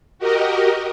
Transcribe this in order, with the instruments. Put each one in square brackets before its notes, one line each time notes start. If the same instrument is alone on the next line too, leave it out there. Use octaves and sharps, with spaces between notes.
[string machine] F#4 G4 A#4 D#5